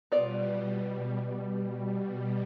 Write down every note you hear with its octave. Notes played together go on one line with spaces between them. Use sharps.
B2 G3 B3 F4 D5